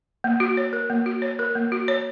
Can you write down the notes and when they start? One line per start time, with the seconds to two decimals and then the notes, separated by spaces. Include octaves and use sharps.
0.24 A#3
0.40 F#4
0.57 C#5
0.73 A#4
0.90 A#3
1.06 F#4
1.22 C#5
1.39 A#4
1.55 A#3
1.72 F#4
1.88 C#5